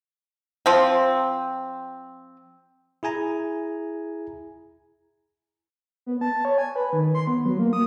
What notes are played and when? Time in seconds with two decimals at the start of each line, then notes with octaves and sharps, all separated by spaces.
0.66 F3 C4
3.03 E4 G#4 G#5 A#5
6.06 B3
6.21 A5
6.45 C#5
6.58 G#5
6.76 B4
6.93 D#3
7.15 C6
7.27 B3
7.45 F#3
7.59 A#3
7.73 D#6